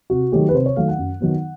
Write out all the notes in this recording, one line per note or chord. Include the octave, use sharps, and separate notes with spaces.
C3 F#4
D#3 F#3 A3 G4
B4
C3 C5
C#5
D#3 F#3 A3 F5
F#5
F#2
D#3 F#3 B3